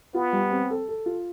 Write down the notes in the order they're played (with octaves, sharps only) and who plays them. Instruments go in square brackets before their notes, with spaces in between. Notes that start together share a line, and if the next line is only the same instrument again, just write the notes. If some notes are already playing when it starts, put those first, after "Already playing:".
[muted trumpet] B3 [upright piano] F4
[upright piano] G3
C4
A4
A4
F4